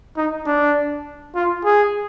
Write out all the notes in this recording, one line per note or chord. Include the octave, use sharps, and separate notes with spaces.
D#4
D4
F4
G#4